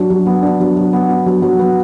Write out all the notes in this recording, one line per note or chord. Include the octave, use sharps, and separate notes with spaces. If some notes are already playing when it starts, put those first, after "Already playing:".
Already playing: F#3 D4
F#3
B3
D4
F#3
F#3
B3
D4
F#3
F#3
B3